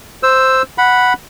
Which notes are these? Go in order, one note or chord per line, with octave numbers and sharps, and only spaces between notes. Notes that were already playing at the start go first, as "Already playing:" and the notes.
C5 E6
F#5 B5